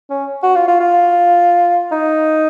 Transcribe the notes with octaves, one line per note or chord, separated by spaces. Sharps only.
C#4
F#4
F4
F4
F4
D#4